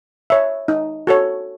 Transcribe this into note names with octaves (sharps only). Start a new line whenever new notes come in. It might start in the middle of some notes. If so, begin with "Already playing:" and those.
C#5 E5
D#4
F#4 A4 C#5